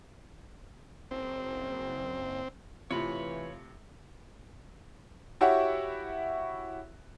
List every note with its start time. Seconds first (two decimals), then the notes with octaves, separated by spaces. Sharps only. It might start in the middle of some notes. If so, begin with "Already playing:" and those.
1.11 F#1 C4
2.91 A2 C3 E3 F4 C#5 B5
5.41 E4 F#4 G4 C#5 E5 F#5